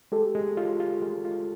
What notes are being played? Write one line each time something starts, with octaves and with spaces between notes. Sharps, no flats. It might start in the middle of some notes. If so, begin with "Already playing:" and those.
G#3 G4 A4
G#3
F4
F4
G#3
F4